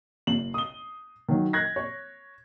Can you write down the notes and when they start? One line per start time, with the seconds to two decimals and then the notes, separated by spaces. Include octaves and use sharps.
0.27 F#1 F#7
0.54 D#6 G7
1.29 D#3 F#3
1.53 F#6 G#6 A#6
1.76 C#5